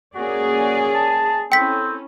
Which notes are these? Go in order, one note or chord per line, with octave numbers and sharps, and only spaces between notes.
A#3 C#4 F#4 G#4 D5
A5
C4 C#4 E4 A4 G5 B6